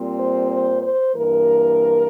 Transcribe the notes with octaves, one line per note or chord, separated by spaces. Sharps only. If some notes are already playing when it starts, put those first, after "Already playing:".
Already playing: A#2 G3 C4
C5
C5
C5
G2 E3 A#3 A#4